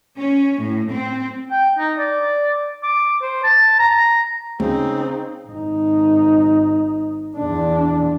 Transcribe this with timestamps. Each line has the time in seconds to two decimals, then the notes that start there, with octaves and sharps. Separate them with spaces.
0.17 C#4
0.61 A2
0.92 C4
1.51 G5
1.78 D#4
1.98 D5
2.83 D6
3.22 C5
3.44 A5
3.79 A#5
4.60 D2 C#3 C4 D#4
5.48 G#1 D#4
7.37 E2 D4